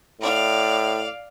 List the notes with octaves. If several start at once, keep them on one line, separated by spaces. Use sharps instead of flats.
A2 D5 F5